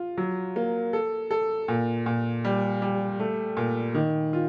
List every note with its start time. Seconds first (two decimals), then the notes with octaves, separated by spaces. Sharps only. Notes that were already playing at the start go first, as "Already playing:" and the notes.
Already playing: F4
0.17 F#3
0.56 A#3
0.93 A4
1.31 A4
1.68 A#2
2.06 A#2
2.45 G3
2.82 G3
3.20 A3
3.57 A#2
3.95 D#3
4.33 F4